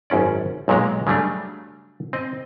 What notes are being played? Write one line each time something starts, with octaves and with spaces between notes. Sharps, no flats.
G#1 F#2 C#4 D5
B1 A#2 F#3 G#3 A#5
C#3 F#3 G3 A3 D4
C4 D#5